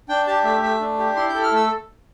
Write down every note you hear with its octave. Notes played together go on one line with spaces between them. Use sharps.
D4 G5
G4 A5
A3 E5
A3 E5
D4
G4
E4 C6
G6
A4
F6
A3 E6